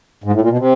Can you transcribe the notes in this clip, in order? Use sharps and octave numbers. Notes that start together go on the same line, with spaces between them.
G#2
A2
A#2
B2
C3